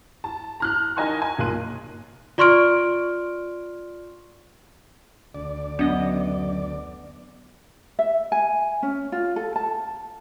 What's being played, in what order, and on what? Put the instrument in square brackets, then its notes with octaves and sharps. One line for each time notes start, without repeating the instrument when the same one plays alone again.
[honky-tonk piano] A5
A#5 F6 F#6
D#4 A#4 D#5 G#5 A5 C#6
G#5
B1 A#2 F5 C6 F#6 D#7
[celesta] F4 D5 C6 C#6 F6 D7
[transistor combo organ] D2 D5
[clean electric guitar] F#2 D#5 [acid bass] B3 [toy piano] D4
[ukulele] E5
G#5
C#4
F4
A4
A5